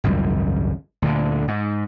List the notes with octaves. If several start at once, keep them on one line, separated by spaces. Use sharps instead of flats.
G#1 C#2 F#2 G3
D2 A#2 D3
G#2